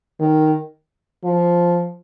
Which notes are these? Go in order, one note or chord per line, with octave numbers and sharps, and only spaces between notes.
D#3
F3